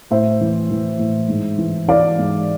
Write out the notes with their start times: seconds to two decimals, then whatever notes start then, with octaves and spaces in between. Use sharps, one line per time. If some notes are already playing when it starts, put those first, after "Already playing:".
0.10 A2 C5 E5
0.41 E3
0.71 E3
0.99 A2
1.28 G#2
1.58 E3
1.88 E3 D5 F5
2.18 G#2